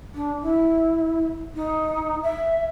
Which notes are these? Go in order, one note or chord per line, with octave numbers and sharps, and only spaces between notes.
D4
E4
D#4
E5